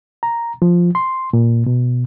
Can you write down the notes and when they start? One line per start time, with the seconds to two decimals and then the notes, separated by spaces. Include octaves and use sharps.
0.23 A#5
0.62 F3
0.95 C6
1.33 A#2
1.66 B2